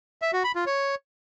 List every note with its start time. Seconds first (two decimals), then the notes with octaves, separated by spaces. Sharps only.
0.22 E5
0.33 F#4
0.44 B5
0.55 F4
0.66 C#5